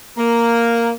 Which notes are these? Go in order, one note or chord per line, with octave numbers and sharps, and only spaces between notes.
A#3 A#4